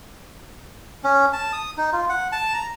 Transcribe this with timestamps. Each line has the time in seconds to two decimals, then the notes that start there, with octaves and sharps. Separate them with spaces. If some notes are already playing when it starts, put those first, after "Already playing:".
1.04 C#4
1.33 A5
1.53 D#6
1.77 D#4
1.93 F4
2.09 F#5
2.32 A5
2.54 A#5